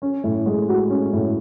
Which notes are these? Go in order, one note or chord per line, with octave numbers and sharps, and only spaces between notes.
C#4
A2
G#3
F#4
C#4
A2